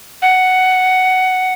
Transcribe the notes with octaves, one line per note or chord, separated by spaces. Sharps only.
F#5